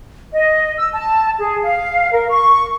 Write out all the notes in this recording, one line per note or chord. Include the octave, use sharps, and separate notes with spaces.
D#5
E6
A5
G#4
F5
A#4
C#6